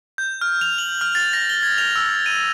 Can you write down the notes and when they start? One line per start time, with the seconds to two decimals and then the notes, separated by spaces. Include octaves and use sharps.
0.18 G6
0.41 F6
0.61 F7
0.78 F#7
1.01 F6
1.15 A6
1.33 A#6
1.49 G7
1.63 G#6
1.78 F7
1.96 E6
2.26 D#7